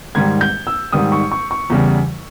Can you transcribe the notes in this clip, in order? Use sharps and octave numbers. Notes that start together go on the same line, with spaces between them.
G#2 D#3 G3 G#6
G6
E6
G#2 D#3 G3 D#6
C#6
C#6
C#6
E2 C#3 G3